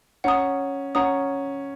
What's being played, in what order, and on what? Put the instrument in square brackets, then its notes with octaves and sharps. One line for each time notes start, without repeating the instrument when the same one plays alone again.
[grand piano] C#4 [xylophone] F#5 A#5 D#6
[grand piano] C#4 [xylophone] F#5 A#5 D#6